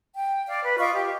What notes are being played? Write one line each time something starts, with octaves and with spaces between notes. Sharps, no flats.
G5
D5 F5
B4
F4 D#5 C#6 D6
G4